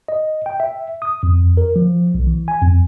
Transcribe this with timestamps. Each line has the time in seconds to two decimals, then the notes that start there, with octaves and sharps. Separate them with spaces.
0.08 D#5
0.46 G5
0.60 E5
1.02 D#6
1.23 F2
1.57 A#4
1.76 F3
2.14 B1
2.27 E3
2.48 G#5
2.62 F2